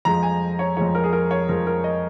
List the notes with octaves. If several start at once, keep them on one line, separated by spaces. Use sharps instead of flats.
F2 F3 G#3 A#5
G#5
C#5
F2 F3 G#3 C#5
A#4
G#4
A#4
C#5
F2 F3 G#3 A#4
A#4
D#5